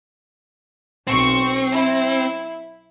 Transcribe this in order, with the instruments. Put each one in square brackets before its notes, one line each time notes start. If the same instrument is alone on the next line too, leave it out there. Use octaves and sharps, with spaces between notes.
[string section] B1 C#6 [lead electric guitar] C4
[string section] E4